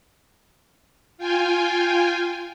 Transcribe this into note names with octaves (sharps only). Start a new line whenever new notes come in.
F4 G5 G#5